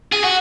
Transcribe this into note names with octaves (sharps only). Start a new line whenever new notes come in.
G#4
F#4